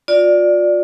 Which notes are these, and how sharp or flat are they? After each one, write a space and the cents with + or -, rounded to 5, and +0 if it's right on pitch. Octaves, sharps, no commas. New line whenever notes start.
F4 +35 D5 +0